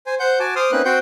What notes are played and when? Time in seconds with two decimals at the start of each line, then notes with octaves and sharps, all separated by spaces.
0.06 C5 G#5
0.20 C5 F#5 G6
0.40 F#4 G#5 A5 D6
0.56 C5 C6 D6 D#6 F6
0.72 A#3 C4 C#4 D#4 B4 F#6
0.85 C4 F#4 F#5 G5 C6 G6